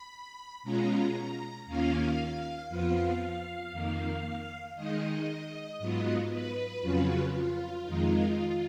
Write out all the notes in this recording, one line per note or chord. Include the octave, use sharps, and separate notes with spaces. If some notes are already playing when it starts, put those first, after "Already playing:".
Already playing: B5
B2 G#3 C#4 F4 A#5
D#2 D#3 A#3 C#4 F4 F5
F2 F3 B3 F4 F5
F2 D#3 A#3
D#3 G#3 D#4 D#5
G#2 F#3 B3 F4
B4
F2 C#3 F#3 C#4 F4
F4
F2 D#3 G#3 D#4